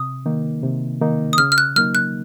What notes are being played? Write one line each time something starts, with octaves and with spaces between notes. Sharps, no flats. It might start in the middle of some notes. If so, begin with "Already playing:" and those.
Already playing: C3 D#6
D#3 A#3 D#4
C3
D#3 A#3 D#4
D#6
C#3 F6
F6
F#6
F#3 A#3 D#4 F6
F#6